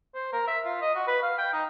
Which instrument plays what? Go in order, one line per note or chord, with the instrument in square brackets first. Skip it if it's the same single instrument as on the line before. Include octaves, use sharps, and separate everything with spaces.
[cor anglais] C5
A#4
E5
F4
D#5
F#4
B4
F5
G5
D#4